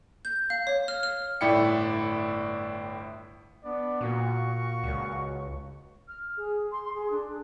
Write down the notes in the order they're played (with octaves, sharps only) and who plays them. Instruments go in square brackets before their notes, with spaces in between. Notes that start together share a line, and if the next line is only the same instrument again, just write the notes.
[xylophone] G6
F5
C#5
F6
F6
[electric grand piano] G1 A2 E4 D5 G5 C#7
[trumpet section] B3 D4 D5
[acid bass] A#2 [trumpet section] F#4 F5 C#6
[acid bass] C#2
[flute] F6
G#4
C6
G#4
D4